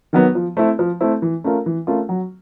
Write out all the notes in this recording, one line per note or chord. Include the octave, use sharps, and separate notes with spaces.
D#3 F#3 B3
F3
A3 C4 E4
F3
A3 C4 E4
E3
A3 C#4 F4 A#4
E3
A3 C#4 F4 A#4
F#3